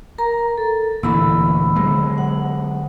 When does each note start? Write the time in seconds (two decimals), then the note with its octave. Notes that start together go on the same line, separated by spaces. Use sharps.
0.18 A#4 A#5
0.58 A4
1.03 D2 A#2 E3 B5 E6
1.76 D3 F#3 G#3
2.18 F#5